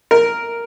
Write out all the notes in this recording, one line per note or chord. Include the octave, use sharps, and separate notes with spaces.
A#4